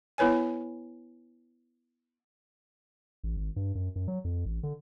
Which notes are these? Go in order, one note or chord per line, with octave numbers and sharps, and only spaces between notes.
B3 E4 B4 C#5 G#5
A1
G#1
G2
F#2
F#2
F#3
F2
A1
D3